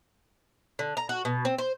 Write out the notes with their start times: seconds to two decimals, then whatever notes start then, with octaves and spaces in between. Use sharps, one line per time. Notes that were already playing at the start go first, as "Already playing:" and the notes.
0.79 D3
0.97 A#5
1.09 F#4
1.25 B2
1.45 C4
1.58 C5